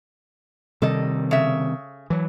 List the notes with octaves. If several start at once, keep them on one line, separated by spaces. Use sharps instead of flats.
C3 D#3 G3 A4 D#5
C#3 E5
E3 F#3